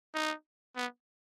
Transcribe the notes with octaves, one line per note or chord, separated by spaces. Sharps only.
D#4
B3